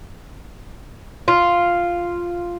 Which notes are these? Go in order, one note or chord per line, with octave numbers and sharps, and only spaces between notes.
F4